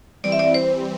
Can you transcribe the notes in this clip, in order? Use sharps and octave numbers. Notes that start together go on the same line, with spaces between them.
E3 G3 C4 D5
E5
D5
C5